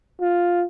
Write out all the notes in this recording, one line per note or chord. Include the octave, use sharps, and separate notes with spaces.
F4